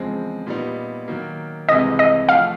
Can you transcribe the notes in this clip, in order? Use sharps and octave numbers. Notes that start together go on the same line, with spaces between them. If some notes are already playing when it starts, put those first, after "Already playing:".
Already playing: E2 C#3 F3 G#3 C4
A#2 G3 B3 D#4
D#3 F#3 A#3
C2 C3 E3 G#3 C4 D#5
D#5
F3 A3 F5